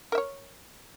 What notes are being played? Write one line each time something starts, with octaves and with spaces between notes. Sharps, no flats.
A#4 C#5 E5